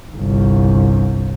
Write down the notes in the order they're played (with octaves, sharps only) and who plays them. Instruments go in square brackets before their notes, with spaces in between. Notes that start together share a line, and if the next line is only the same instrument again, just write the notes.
[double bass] G1 C2